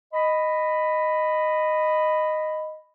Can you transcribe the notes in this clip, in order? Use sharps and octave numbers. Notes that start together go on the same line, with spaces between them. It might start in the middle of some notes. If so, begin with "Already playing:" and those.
D#5 B5